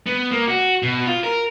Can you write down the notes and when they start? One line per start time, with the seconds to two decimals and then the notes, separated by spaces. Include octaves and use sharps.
0.06 B3
0.32 A#3
0.47 F#4
0.83 B2
1.07 F4
1.23 A#4